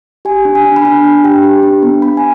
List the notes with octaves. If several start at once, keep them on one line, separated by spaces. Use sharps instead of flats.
G4 G#5
D4
G#5
D4
B5
D4 G#5
D4
G4 G5
G4
D4
B3
B3 B5
G#5